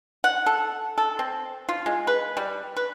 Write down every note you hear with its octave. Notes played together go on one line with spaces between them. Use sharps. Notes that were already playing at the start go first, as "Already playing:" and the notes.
F#5
A4
A4
C4
F4
G#3
B4
G3
B4